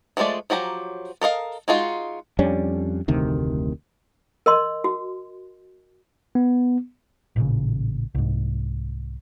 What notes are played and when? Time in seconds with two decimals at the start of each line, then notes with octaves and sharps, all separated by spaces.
0.17 E3 F3 G#3 A3 D5
0.50 F3 F#3 G4 A#5
1.21 A4 A#4 D#5 F5
1.68 G#3 D#4 F4 F#4
2.39 F2 G3 C#4 D4
3.08 F1 D2 C3 D#3
4.46 A#4 D#5 C6
4.84 F#4
6.35 B3
7.36 A1 A#2 C#3
8.15 C2 G#2